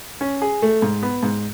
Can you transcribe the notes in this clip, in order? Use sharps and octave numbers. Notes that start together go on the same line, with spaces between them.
C#4
G#4
A3
G#2
B3
G#2